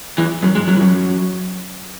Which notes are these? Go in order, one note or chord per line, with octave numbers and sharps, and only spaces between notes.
E2 E3
F#2 F#3
G#2 G#3
F#2 F#3
E3
F#2 F#3